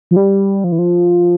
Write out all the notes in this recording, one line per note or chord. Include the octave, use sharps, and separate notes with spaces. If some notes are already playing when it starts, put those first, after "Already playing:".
F3
G3
F3
E3
F3